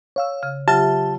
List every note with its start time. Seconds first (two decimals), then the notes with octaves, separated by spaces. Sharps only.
0.16 C#5 F5 E6
0.43 C#3
0.68 C#3 F#3 F4 G4 E5 A5